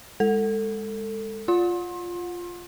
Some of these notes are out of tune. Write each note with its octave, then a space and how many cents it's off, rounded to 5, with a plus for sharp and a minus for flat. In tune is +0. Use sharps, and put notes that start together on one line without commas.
G#3 -20 A4 +20
F4 +0 F#5 -30 C6 +30